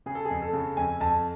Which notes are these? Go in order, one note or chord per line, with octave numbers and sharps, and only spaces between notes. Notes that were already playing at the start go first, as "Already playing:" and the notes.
C#3 G#4
A4
G#4
F2
A4
C#3
F2 G#5
F2 A5